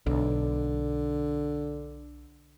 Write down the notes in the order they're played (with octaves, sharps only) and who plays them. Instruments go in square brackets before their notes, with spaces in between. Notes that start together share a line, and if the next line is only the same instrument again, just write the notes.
[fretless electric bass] B1 [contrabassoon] D3